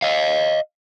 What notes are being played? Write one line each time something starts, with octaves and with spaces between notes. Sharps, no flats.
D#5 F5